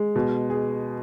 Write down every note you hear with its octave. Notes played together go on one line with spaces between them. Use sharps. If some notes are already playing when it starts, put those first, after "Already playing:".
Already playing: G#3
B2
G#4